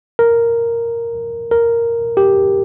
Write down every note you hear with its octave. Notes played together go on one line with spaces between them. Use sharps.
A#4
A#4
G4